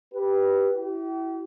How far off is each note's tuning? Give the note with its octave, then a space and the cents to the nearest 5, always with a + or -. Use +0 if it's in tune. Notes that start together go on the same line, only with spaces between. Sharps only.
G4 +0 B4 -15
E4 +0 G4 -40